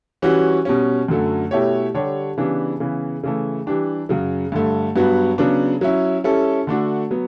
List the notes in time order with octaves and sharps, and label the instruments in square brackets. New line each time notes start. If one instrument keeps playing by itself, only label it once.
[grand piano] E3 G3 C#4 F#4
B2 G3 C#4
F#2 D3 F#3 A3
B2 A3 E4 G4 C#5
D3 G3 D4 G4 C#5
C#3 E3 G3 B3 D4
C#3 E3 B3
C#3 E3 A3
E3 G3 D4 G4
F#2 C#3 F#3
G2 D3 A3
G2 F#3 B3 F#4
C#3 F#3 B3 D4
F#3 C#4 E4
G3 C#4 E4 A4
D3 A3 D4 F#4
F#3 B3